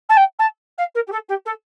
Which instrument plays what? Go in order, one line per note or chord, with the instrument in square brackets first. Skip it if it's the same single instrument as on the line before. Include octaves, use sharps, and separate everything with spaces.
[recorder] A5
G5
A5
F5
A#4
G4
A4
G4
A4